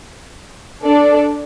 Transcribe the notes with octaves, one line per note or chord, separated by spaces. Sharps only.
D4 A4 D5